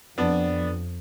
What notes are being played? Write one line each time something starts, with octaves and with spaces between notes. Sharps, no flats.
F2 B3 D4